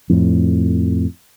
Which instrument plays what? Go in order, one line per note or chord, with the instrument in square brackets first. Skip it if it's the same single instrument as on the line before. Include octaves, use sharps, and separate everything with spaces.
[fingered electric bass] F2 A2